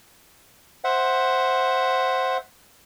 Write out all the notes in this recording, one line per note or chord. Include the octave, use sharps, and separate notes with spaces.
C5 E5 F#5